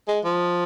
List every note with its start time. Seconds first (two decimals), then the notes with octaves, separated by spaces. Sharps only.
0.08 G#3
0.25 F3